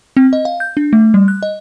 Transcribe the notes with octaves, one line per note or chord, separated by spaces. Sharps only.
C4
D#5
F5
G6
D4
A3
G3
F#6
D#5